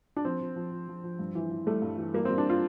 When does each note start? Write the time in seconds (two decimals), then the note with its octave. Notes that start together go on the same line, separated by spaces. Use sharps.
0.16 D4
0.25 F3 C4
0.41 F3
0.56 F3
0.71 F3
0.88 F3
1.04 F3
1.19 G2
1.35 E3
1.51 E3
1.67 G3 A3
1.82 G2
1.98 E3
2.14 G3 A#3
2.25 G3 C4
2.38 D4
2.50 F4